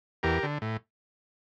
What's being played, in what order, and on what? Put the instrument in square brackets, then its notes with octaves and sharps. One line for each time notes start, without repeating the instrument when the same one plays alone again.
[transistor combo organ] E2 G4 A#4
D3
A2